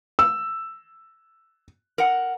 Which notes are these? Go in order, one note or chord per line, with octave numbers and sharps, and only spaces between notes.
E6
A#4 F#5